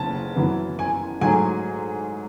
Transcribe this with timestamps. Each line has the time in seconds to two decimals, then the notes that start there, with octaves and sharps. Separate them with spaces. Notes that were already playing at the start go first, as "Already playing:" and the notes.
Already playing: F#1 C#3 B3 A5
0.36 F#2 E3 B3
0.79 G#5
1.21 G#2 F#3 A3 G#5